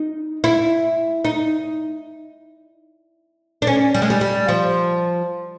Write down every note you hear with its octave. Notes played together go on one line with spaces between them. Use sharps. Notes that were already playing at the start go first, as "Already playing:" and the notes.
Already playing: D#4
E4
D#4
D4
C#4
G3
G#3
G3
G3
F3